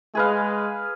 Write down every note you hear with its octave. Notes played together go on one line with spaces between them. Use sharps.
G#3 G#4 B4 F5